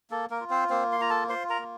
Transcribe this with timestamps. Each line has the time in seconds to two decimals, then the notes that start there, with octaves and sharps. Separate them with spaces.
0.11 A#3 A4
0.30 A#3 A#4
0.40 F4
0.50 C4 C5
0.70 A#3 C4 C5
0.92 C6
1.00 F4 A#5
1.10 A4 A5
1.29 F4 C5 C6
1.49 A#4 A#5
1.59 A#3